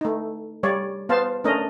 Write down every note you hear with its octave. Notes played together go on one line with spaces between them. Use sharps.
A3 D#4
G3 C#5 D5
B3 C5 F5 A5
A3 C#4 D4 A#4 D#5